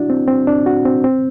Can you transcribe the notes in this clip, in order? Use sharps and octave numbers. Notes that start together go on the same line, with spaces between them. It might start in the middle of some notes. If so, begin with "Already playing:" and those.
Already playing: D4 E4 F#4
C4
C4
D4
F#4
C4
C4